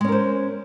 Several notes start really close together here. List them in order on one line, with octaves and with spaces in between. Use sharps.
G#3 C#4 A#4 C5